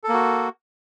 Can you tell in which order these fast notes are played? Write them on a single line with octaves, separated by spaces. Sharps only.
A4 A#3 F#4